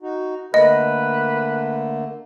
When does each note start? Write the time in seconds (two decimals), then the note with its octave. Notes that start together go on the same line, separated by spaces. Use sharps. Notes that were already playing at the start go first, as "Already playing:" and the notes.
0.02 D#4 F#4
0.54 D3 A3 A#3 B4 D#5